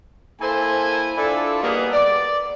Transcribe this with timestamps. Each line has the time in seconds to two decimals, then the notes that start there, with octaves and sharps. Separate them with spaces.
0.41 A#3 E4 A4 C5 G#5
1.18 D4 E4 F4 A4
1.63 G3 A#3 B3 G#4 A#4 D#5
1.93 D5